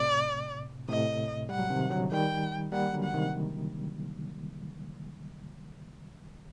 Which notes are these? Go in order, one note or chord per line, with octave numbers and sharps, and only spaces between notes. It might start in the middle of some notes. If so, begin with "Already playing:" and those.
Already playing: A2 C3 D5
A2 C3 D#5
G3 F#5
F#3
C3 D#3
D3 F#3
D#3 G3 G5
G3 A#3 F#5
D3 F#3
F#5
C3 D#3